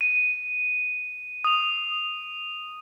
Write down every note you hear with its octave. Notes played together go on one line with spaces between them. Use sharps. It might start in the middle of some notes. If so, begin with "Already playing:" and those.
D#7
D#6 F7